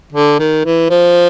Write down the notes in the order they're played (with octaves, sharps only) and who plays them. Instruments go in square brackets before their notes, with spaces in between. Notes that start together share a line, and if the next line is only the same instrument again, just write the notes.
[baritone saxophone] D3
D#3
E3
F3